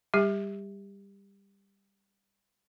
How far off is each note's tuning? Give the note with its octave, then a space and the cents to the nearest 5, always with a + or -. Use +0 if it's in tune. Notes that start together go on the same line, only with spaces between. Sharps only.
G3 +15 G4 +25